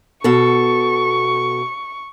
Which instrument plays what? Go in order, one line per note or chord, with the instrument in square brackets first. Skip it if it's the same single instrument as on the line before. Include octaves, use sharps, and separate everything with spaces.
[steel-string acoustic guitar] B2 A4 [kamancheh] C#6